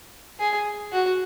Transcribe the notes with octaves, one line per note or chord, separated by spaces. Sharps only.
G#4
F#4